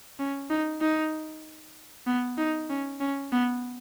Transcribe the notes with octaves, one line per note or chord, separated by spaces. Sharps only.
C#4
D#4
D#4
B3
D#4
C#4
C#4
B3